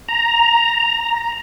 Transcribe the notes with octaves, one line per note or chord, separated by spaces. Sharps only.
A#5